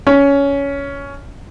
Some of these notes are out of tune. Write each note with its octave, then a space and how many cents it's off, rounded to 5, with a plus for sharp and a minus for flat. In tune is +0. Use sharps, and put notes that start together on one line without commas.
C#4 +15